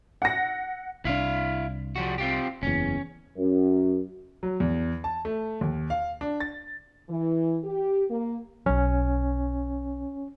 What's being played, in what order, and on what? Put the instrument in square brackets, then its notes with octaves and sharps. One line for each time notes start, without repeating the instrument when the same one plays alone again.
[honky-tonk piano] F#5 A#6
[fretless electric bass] C2 D4 [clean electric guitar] E4 F5
[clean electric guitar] F3 G3 F#4
C4 F4 G4
[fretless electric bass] F#1 E2 [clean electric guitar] C#4
[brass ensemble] F#2
[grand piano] F#3
E2
A5
A3
D#2
F5
D4
A6
[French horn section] E3
G4
A#3
[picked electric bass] B1 F#3 [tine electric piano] C#4